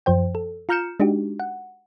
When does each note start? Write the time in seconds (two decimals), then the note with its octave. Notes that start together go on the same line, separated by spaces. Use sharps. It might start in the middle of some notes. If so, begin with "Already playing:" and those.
0.06 F#2 F3 C5 G5
0.35 A4
0.69 F4 A#5 F6 G6 C#7 E7
1.00 G#3 D4 D#4 F#4 G4
1.40 F#5